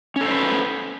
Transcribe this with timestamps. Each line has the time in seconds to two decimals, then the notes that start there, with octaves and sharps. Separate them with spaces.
0.16 C#4
0.21 A4
0.26 C5
0.31 B4